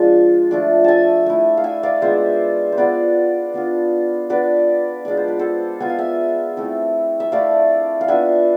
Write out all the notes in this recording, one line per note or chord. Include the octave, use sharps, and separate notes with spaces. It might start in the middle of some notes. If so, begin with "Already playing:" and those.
Already playing: F3 G#3 D4 F4 G#5
F3 A3 D4
E5 G#5 A5
A3 E4
F5
E5 G#5
D5 F5
G#3 B3 D4 F4 C5 E5
C5
B3 D4 F4 B4 D5
B3 D4 F4
B3 D4 F4 B4 D5
G#3 B3 D4 F4 D5
C5
B4
A4 C5
B3 F4 G#5
F5
E5 G#5
A3 C4 E4
E5
A3 E4 D5 F5
F5
B3 D4 F4 E5 G#5